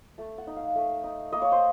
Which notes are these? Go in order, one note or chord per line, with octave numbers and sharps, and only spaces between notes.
A3 A5
F#5
D#4
F5
A3
D#4
A#3 D#5
C#5
C5